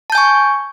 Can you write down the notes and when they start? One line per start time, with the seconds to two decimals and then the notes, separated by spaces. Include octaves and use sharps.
0.10 A5
0.12 G6
0.15 G#5
0.18 C#6